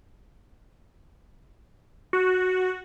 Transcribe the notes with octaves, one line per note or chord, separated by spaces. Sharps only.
F#4